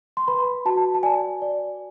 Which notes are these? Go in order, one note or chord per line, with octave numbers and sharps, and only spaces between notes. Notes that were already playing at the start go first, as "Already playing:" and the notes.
C6
B4 B5
F#4 A5
A5
D5 G#5
D5